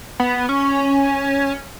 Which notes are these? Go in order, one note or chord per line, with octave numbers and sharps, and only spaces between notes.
B3
C#4